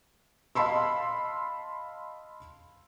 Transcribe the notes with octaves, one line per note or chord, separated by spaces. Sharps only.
D#5 F5 A5 B5 C6 E6